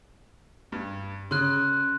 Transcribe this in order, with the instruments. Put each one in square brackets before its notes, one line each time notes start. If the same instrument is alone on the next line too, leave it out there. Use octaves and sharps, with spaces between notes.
[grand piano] G2
[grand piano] C#3 [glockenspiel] C6 F#6